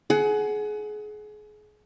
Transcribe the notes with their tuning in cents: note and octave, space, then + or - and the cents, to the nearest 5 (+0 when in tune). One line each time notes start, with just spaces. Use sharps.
G#4 +30 F#5 +15